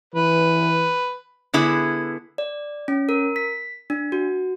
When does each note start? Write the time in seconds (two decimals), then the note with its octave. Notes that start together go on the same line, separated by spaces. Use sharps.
0.15 E3 B4
1.54 D3 B3 E4 G#4
2.38 D5
2.88 C#4
3.09 A#4
3.36 B6
3.90 D4
4.12 F#4